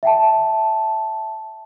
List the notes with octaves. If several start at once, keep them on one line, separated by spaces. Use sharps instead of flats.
E5 G5 A5